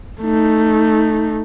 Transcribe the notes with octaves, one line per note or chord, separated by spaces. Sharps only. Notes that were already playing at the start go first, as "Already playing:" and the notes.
A3 D#4